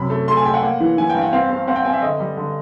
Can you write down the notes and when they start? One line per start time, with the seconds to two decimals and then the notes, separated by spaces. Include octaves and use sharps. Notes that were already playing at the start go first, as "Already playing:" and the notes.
Already playing: F#2 C3 B5
0.10 A3
0.28 A3 C6
0.37 G#5
0.45 A3 G5
0.54 F#5
0.63 A#3
0.80 E3
0.98 E3 G#5
1.10 G5
1.15 G2
1.22 F#5
1.33 C4 F5
1.50 C4
1.68 C4 F#5
1.76 G5
1.85 C4 G#5
1.93 E5
2.02 D3 D#5
2.20 G3
2.37 D3